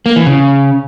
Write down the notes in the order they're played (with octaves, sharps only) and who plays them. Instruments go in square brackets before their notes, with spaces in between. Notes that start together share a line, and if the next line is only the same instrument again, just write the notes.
[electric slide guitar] A#3
E3
C#3